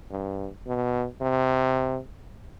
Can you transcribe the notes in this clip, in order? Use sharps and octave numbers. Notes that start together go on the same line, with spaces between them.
G2
B2
C3